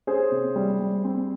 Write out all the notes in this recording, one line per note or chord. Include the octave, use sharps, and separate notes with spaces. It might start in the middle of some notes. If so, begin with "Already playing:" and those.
C#4 G#4 C5
C3
G3
G3
C4